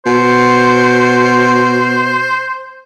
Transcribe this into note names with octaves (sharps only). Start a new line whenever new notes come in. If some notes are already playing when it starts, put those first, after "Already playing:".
B2 C5